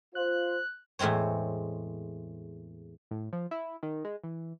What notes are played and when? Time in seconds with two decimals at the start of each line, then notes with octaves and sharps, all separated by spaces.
0.15 F4 C5 F#6
0.99 E2 A2 G#3 C4 C#5
3.11 A2
3.33 F3
3.51 E4
3.83 D#3
4.04 G#3
4.24 E3